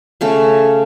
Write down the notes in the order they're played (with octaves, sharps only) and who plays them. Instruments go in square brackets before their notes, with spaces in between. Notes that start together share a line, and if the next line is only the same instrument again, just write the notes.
[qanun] C#3 A3 C#4